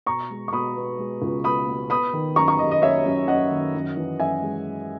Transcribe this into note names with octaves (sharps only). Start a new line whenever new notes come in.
B2 A#5 C#6
G#3
C#6
B2 B5 D#6
B3
G#3
C#2
B3 B5 D#6
B3
B3 B5 D#6
D#3
F#2 A#5 C#6
A#5 C#6
D#3 D#5
D#5
F#2 C#5 E5
F#2
F#2 D#5 F#5
D#3
F#2
E3
F#2 E5 G#5
G#3